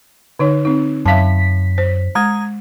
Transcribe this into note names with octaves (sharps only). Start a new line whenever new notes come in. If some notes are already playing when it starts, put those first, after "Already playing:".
D3 D#4 C#5
C4 D#4
F#2 E5 F5 A5 B6
C5
G#3 A#5 D#6 G#6